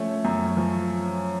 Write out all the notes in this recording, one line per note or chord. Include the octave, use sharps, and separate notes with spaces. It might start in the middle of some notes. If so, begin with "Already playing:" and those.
Already playing: F3 A3 C#4
F#2
F3